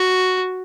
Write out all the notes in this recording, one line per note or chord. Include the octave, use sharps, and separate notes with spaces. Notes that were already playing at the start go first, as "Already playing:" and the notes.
Already playing: F#4